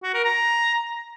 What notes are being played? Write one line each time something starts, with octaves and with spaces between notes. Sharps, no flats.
F#4
A#4
A#5